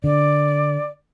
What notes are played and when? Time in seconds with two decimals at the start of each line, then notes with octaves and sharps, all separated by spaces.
0.04 D3 D5